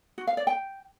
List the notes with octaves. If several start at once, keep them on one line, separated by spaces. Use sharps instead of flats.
F#4
F5
D5
G5